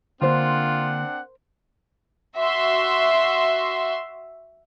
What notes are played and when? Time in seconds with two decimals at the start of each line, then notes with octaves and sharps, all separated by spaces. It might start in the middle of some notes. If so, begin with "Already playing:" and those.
0.22 D3 A#3 C4 D4 F4 A#4 C5 F#5
2.38 F#4 E5 C6